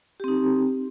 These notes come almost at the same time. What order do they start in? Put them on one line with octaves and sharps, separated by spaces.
G4 C4 D#4